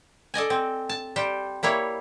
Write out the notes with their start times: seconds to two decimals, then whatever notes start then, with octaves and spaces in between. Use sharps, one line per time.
0.34 A4 D5 D#5 G#5
0.50 C4
0.89 A5
1.16 G3 C5 G5
1.63 G3 A#3 E4 C#5